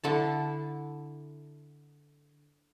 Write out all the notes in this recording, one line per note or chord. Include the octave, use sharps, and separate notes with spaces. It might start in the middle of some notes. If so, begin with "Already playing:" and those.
D3 E4 A5